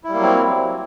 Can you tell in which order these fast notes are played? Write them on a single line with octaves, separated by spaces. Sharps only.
E4 G3 A#3 F#3 C4